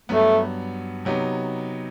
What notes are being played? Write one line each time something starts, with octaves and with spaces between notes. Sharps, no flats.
G2 F#3 A3 B3
C3 F#3 B3 D#4